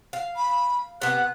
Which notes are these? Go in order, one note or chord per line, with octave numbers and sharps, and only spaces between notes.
F5
B5
C3 B3 F#6